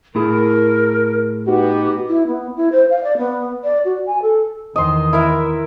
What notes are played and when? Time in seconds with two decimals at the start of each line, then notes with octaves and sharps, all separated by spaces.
0.15 A2 E4 G#4 A#4
1.46 B3 D#4 F#4 G4
2.08 E4
2.27 B3
2.57 E4
2.72 C5
2.90 F5
3.04 D5
3.18 B3
3.64 D5
3.85 F#4
4.06 G#5
4.22 A4
4.76 E2 D#3 D#5 C6
5.13 E4 A#4 E5